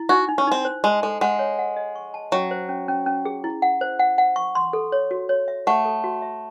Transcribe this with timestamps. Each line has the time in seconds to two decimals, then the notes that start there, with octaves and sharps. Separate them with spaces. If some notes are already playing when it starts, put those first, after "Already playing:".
Already playing: E4
0.09 D#4 F#4
0.28 D#4
0.38 C#4
0.47 C4 D#4
0.65 C5
0.84 G#3 A5
1.03 G#3 A4
1.21 G#3 F#5
1.39 C#5
1.59 F#5
1.77 D#5
1.95 C#6
2.14 A5
2.32 F#3 C#4
2.51 C5
2.69 C#4
2.88 C#4
3.06 C#4
3.25 G#4
3.44 E4
3.62 F#5
3.81 C5
3.99 F#5
4.18 F#5
4.36 C#6
4.55 C6
4.73 A4
4.92 C#5
5.11 F#4
5.29 C#5
5.48 E5
5.67 A3 F#5
5.85 A4
6.04 F#4
6.22 E5